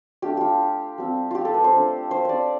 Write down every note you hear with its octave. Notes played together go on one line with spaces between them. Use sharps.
A3 D4 F4 G4
F4 G4
G3 C4 F4
F4 G4
A4
B4
C5
A3 D4 F4
C5
C5 D5